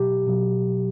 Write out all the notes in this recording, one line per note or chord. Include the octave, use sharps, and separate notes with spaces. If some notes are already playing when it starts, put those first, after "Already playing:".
Already playing: B2 F#3 G4
B2 F#3